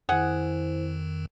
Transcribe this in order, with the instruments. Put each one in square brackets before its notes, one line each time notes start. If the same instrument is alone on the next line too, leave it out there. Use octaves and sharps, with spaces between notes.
[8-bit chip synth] F2 D#3 [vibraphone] E4 C5 [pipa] G#4 F#5